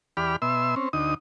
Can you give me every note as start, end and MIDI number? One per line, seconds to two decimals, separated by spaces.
0.17 0.36 40
0.17 0.36 67
0.17 0.36 74
0.17 0.36 83
0.17 0.36 89
0.42 0.75 47
0.42 0.75 76
0.42 0.75 84
0.42 0.75 88
0.76 0.89 60
0.76 0.89 61
0.93 1.14 38
0.93 1.14 63
0.93 1.14 87